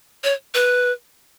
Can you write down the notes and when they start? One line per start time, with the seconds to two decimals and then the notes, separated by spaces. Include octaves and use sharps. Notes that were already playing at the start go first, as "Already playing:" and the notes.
0.24 C#5
0.54 B4